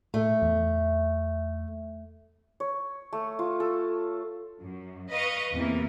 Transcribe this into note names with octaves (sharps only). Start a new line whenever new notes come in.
A2 A3 A4
E2
C#5
A3
F4
A4
F#2
B4 D#5 F5 C#6
E2 C3 E3 A#3